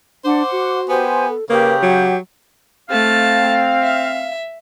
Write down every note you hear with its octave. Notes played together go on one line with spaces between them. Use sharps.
D4 C5 F#5 D6
F#4
B3 G4 C5 G#5
A4
C#3 A#3 G4 B4
F#3 F#5
A3 C4 F5 A5
E5